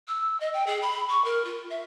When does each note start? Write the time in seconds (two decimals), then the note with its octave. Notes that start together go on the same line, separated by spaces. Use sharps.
0.08 E6
0.40 D#5
0.53 G5
0.67 G#4
0.82 B5
1.10 C#6
1.25 A#4
1.45 F4
1.70 E5